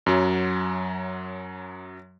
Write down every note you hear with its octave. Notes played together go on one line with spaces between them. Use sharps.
F#2 F#3